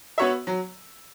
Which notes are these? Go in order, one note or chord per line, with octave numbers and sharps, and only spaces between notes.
B3 F#4 C#5 E5
F#3